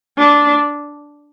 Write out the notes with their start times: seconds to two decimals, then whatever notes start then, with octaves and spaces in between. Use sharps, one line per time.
0.18 D4